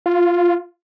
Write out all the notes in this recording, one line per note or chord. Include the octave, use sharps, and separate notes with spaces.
F4